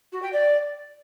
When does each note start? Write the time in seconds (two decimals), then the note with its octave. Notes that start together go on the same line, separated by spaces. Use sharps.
0.12 F#4
0.22 G5
0.33 D5